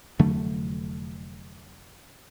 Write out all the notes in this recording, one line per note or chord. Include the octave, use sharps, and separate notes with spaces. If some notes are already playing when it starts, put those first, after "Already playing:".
F1 D3 F#3 A3